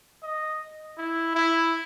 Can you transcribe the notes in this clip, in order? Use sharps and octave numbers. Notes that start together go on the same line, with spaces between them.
D#5
E4
E4